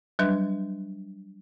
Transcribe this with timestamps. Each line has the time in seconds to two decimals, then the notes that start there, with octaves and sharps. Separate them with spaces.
0.19 F#3 G3 D4 B4